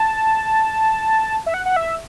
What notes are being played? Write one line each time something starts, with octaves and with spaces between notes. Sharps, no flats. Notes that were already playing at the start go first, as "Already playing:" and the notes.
Already playing: A5
E5
F#5
F#5
E5